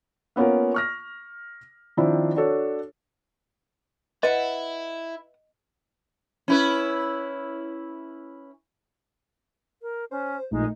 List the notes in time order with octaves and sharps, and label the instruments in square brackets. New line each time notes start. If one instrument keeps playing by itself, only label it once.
[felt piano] A#3 B3 C#4 F4 A#4
C#6 F6 A#6
D#3 F3 C4 D4 E4
D4 F#4 A4 C#5
[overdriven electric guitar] E4 [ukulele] B4 F#5 [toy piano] D#5
[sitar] C#4 E4 B4
[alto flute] A#4
[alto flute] C#4 [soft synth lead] C5
[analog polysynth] A#1 D#4 [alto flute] G#3 [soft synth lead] A3